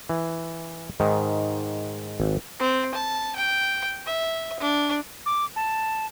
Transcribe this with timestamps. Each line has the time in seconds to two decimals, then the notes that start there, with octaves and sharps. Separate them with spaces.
0.09 E3
1.00 G#2 D#3
2.20 G#1
2.60 C4
2.95 A5
3.36 G5
4.06 E5
4.60 D4
5.26 D6
5.56 A5